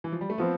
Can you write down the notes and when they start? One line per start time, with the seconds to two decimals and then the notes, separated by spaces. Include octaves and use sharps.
0.04 E3
0.12 F3
0.21 G3
0.30 A3
0.38 F3 B3 C4